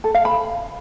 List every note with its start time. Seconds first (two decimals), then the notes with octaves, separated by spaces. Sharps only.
0.04 A4
0.15 F5
0.25 B5